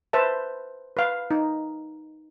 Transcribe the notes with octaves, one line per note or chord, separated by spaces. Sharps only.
B4 C5 E5 A5
B4 F5
D#4